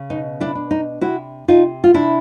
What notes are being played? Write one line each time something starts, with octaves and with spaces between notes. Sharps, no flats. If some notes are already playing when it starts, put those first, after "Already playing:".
Already playing: C#3
B2 D#4
D4 E4
D4
D#4
C3 E4 F#4
C3 D#4 F4
F4
C3 D4 E4